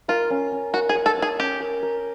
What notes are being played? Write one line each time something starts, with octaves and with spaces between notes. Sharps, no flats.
F4 A#4
C#4
C#4
F#4 A#4
G#4
C#5
A4
G#4 C#5
C#4 G4
A#4
A#4